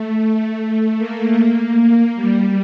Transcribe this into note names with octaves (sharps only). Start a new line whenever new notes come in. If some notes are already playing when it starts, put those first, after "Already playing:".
Already playing: A3
A3
A3
A#3
G3